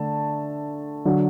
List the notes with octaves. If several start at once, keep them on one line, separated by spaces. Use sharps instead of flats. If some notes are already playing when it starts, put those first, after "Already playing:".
Already playing: D3 A3 D4 A5
D3 F#3